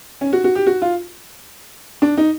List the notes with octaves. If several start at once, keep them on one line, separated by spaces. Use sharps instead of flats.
C#4
F#4
F#4
G4
F#4
F4
D4
D#4